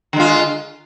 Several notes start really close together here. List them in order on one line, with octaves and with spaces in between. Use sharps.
D3 G#3 F4